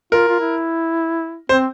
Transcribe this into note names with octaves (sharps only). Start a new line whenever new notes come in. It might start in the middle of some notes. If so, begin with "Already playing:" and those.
F4 A#4
F4
E4
C4 C5